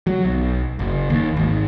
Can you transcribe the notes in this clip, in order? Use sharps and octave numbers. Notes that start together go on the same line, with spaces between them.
F#3
B1
F#1
D#2
G#1